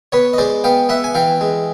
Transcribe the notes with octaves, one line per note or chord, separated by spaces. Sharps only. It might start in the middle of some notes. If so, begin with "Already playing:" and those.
B3 B4 C#5
D#5
G#3 C5 D5
B3 F5 G5
B3 E5 F#5
G#5
E3 F5 G5
G#3